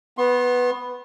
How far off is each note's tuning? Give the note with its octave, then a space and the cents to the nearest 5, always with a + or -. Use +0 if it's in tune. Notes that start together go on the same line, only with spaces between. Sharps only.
B3 +0 C6 +35